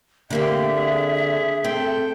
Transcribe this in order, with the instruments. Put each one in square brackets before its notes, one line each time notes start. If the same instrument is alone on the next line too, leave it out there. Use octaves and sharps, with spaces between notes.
[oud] D3 A#3 C4 [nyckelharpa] G4 [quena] E5
[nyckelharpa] G#4
[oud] C4 [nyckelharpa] A4 G5